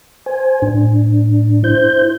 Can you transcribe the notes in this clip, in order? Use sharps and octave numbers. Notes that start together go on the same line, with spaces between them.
C5 G#5
A2 D4
E4 C5 G6